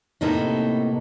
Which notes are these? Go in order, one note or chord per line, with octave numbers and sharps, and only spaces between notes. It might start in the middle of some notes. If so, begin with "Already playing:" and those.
A2 C3 A#3 B3 D#4 A4